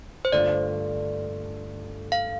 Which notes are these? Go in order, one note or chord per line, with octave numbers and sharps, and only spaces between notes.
C5
G2 D3 A3 D4 F4 D5
F5